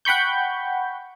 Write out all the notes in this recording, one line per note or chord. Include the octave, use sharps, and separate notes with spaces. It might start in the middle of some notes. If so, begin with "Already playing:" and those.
F#5 G5 B5 C#6 G6